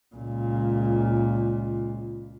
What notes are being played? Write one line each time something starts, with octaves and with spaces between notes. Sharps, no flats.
C#2 A#2